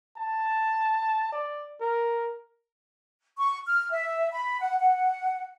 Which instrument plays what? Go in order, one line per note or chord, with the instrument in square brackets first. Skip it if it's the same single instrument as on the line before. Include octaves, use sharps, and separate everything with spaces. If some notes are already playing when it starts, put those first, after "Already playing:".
[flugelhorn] A5
D5
A#4
[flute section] C#6
F6
E5
B5
F#5
F#5